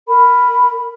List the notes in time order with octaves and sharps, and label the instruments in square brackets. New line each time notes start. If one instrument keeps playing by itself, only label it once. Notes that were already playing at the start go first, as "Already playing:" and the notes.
[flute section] A#4 B5